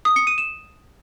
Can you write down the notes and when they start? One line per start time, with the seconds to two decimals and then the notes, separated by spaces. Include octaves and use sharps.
0.05 D#6
0.16 C#7
0.27 D#7
0.38 E7